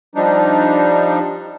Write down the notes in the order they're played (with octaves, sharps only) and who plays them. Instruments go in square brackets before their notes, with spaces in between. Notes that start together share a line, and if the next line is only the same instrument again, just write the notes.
[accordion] F3 G3 D4 D#4